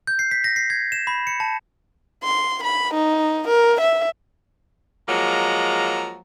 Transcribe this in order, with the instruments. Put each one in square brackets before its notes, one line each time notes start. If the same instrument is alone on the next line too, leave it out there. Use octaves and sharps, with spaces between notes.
[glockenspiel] G6
C7
B6
A#6
C7
G#6
E7
B5
C#7
A5
[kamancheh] C6
B5
D#4
A#4
E5
[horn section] F3 F#3 G#3 A#3 A#5